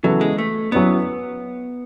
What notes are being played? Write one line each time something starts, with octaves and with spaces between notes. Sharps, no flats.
C#3 E3 F#3 B3 E4 A4
G#3
A3
F#3 B3 C#4 E4 B4